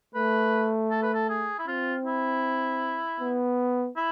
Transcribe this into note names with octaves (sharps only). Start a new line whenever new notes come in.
A3 B4
A4
B4
A4
G#4
E4
C4 F4
E4
B3
E4